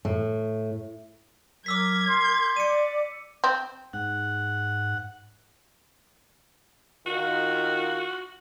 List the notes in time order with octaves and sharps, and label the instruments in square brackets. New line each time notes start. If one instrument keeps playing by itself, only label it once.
[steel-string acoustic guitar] A2
[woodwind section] F#3 [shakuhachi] A#4 [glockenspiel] D6 E6 B6 [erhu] G#6
[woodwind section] C6
[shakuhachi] D5 [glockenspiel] C#7 D#7
[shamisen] C4
[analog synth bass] G#2 [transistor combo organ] F#5
[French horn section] D#3 F4 [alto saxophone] F#4